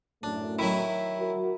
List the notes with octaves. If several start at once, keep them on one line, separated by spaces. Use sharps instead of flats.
F#2 A2 A3 D4
D#3 F#3 E4
F#4 A#4